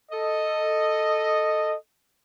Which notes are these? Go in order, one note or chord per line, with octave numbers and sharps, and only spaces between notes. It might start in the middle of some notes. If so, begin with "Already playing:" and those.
A4 D#5